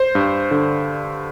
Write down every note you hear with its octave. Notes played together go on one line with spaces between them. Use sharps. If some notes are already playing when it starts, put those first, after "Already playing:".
Already playing: C5
G2
D3